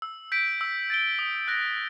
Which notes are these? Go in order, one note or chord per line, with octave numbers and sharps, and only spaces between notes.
E6
G6 B6 D7
E6
A6 D7 G7
D#6
F#6 A#6 D7